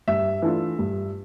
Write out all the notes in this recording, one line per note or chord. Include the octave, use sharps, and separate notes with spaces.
G2 E5
E3 A3 D4 F4
G2